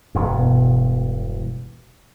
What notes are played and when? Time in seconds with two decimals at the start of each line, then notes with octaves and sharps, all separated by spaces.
0.15 E1 G2
0.39 B2